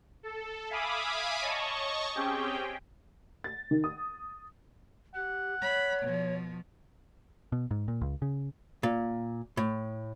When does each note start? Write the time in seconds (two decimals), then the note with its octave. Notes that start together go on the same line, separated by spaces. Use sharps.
0.23 A4
0.69 E5 F5 G#5 B5 D6 D#6
1.41 C#5 D#5 A5 C#6
2.15 C4 C#4 G4 G#4 G5
3.44 A6
3.71 D#3
3.84 D#6
5.15 G4 F#5
5.61 C#5 B5
6.03 B2 F3
7.52 B2
7.71 G#2
7.88 A#2
8.01 C#2
8.22 C#3
8.83 A#2
9.57 A2